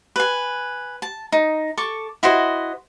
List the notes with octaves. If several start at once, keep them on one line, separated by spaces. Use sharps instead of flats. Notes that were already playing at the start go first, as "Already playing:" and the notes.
B4 G#5
A5
D#4
A4 C#6 D6
E4 F#4 C5 D#5